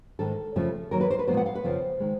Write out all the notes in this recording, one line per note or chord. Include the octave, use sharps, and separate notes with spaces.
G#2 D#3 G#3 A4
F2 C#3 F3 A3
D#2 D#3 F#3 A#4
B4
C5
B4
A#2 F3 G#3 B3 C5
F#5
F5
B4
F2 C#3 F3 C4 C5
D#3 G#3